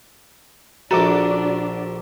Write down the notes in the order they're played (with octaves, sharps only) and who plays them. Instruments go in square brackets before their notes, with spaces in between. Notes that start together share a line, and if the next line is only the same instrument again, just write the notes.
[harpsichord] A#1 A4 [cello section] D4 [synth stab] F#4 D6 [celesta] A#5